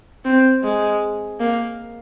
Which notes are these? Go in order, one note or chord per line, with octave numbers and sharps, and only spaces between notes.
C4
G#3
A#3